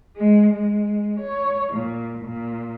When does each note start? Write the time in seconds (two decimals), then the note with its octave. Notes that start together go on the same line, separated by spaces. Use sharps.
0.15 G#3
0.54 G#3
1.19 C#5
1.72 A#2
2.24 A#2